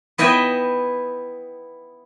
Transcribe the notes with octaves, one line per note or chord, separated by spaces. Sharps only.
B3 E4 D#5 E5 G5